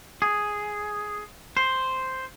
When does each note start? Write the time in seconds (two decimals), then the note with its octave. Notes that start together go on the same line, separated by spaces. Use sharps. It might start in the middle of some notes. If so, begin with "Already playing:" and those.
0.22 G#4
1.57 C5